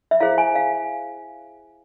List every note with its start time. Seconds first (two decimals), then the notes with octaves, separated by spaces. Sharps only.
0.11 E5
0.20 E4 G#4 C5 F5
0.38 G#5
0.55 F5